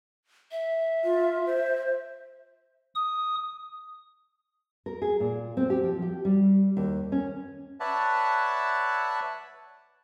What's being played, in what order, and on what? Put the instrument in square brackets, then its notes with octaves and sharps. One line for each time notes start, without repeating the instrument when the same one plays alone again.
[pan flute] E5
[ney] F4
C5
[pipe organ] D#6
[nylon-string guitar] A#4
G#4
A#2
C4
G4
F3
G4
G3
D#2
C#4
[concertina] B4 C#5 D5 E5 F#5 A5